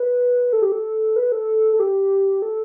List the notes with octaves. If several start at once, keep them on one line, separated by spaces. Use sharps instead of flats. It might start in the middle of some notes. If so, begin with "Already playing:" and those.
Already playing: B4
A4
G4
A4
B4
A4
A4
G4
A4